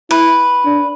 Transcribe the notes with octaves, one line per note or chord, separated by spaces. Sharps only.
E4 B4
D4